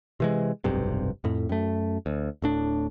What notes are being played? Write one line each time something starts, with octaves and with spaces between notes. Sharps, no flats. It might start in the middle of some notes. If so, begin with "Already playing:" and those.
C3 E3 G#3
F1 B1 G2 C3
F2 A2
F#2 A3
D2
D1 A2 D4